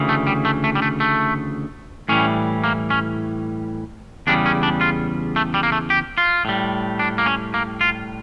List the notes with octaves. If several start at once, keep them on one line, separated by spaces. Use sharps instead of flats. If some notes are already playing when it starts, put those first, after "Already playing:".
Already playing: D2 C#3 E3
A3
G3
A3
A3
G3
A3
A3
A2 E3 G3 C#4
A#3
C#4
E2 C#3 G3 D4
C#4
D4
F4
A3
G3
A#3
A3
G4
F4
A2 G3
D4
A#3
C#4
A#3
F4